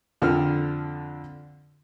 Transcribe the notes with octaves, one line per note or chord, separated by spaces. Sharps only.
F2 D3 F3 C4 F6